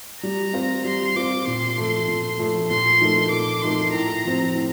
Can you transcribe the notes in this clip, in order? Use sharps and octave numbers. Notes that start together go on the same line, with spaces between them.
G3 A#5
C4 F4 C5
G3 C6
C4 F4 C5 D6
A#2 C6
F3 A3
A#2
F3 A3
A#2 C6
F3 A3 D#4 A#4
A#2 D6
F3 A3 D#4 A#4 C6
A2 A#5
F3 C4
A2